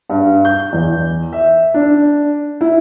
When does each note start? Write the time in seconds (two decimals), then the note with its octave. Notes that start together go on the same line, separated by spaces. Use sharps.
0.09 G2
0.45 G6
0.73 E2
1.33 E5
1.74 D4
2.61 E4